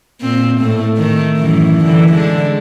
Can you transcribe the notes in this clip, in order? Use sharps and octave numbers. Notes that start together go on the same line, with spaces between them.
A#2 C4
A2 A3
D#3 A3
F#2 A2 E3
D3 E3
D3 G#3 D4